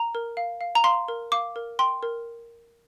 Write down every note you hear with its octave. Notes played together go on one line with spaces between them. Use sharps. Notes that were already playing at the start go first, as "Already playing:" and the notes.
Already playing: A#5
A#4
F5
F5
A#5
F5 C6
A#4
F5 D6
A#4
G5 C6
A#4